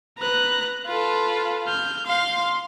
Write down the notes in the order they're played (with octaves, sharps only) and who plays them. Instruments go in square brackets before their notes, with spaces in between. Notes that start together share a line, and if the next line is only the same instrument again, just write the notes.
[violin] B4 [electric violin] A#5 F#6
[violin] F4 A4 [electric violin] B4
[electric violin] F6 G6
[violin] F5 [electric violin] C6